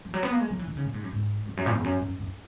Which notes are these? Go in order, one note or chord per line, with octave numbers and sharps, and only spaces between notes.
E3
F#3
B3
A#3
G#3
F#3
E3
D#3
C#3
A#2
G#2
F#2
G#2
E2
F#2
A#2
E2
F#2
F#2
F#2